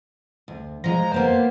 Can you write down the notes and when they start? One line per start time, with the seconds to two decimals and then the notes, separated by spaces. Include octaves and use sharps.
0.48 D2
0.84 F3 G3 G#3 A#5
1.12 A#3 B3 G4 C5